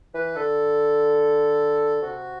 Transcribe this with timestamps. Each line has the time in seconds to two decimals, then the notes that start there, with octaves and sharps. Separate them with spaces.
0.14 E3 B4
0.35 D3 A4
2.02 C3 F#4